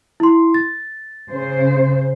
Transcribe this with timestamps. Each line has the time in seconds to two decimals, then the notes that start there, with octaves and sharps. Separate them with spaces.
0.20 E4 C6
0.54 A6
1.29 C#3 C5